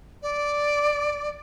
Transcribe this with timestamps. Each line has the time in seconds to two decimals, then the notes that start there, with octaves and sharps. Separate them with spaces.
0.23 D5